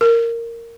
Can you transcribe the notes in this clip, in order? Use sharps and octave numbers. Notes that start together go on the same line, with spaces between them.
A#4